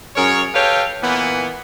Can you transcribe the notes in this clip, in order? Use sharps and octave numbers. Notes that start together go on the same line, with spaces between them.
F#2 G#4 A#4 C#5
G4 A4 B4 C#5 F5 G5
A#2 E3 A#3 B3